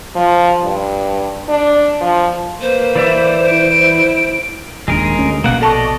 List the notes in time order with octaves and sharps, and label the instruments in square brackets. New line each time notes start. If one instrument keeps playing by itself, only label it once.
[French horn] F3
G2
D4
F3
[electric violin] A#3 B4 [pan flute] C5
[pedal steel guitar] E3 D5 E5
[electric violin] E4 D7
[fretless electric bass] D#1 D#2 D4 [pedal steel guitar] G#3 G#4 A#4
[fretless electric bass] D2 C#4
[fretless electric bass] A#1 B2 [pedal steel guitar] A#3 F#5
[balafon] A4 A5 C#6 [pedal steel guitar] D5 D#5